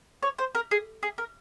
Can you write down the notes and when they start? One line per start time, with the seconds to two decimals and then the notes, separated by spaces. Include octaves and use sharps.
0.23 C#5
0.38 C5
0.55 A#4
0.71 G#4
1.03 G#4
1.18 A#4